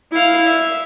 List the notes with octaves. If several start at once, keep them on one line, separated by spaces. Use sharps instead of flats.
E4 F5
E5